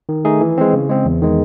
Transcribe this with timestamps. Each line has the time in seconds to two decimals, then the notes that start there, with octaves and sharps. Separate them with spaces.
0.09 D#3
0.25 A3 D#4 G#4
0.41 E3
0.58 G#3 C4
0.73 C#3
0.89 G#3 C4
1.05 E2
1.22 D#3 G#3